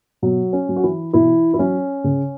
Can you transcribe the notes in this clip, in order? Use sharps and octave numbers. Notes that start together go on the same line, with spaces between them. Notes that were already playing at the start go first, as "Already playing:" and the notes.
B2 F#3 F#4
C#4
F#3
F#4
E3 E4
B2 E3 E4
E4
F#3 C#4
C#3